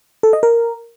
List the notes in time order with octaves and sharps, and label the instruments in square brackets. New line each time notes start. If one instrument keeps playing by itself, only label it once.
[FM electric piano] A4
D#5
A#4